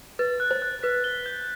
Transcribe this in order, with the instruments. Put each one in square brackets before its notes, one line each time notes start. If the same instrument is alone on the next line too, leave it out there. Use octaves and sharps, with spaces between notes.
[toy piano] B4 [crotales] A6
[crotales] F#6
[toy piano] C5
[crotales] F#6
[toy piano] B4 [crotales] B6
[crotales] G7
G6